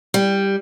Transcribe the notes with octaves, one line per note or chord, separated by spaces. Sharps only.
G3